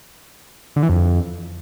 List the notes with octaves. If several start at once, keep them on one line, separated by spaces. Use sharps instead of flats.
D3
E3
F2